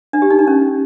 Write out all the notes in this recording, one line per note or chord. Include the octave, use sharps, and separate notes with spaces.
D4
G4
D#4
D4
C#4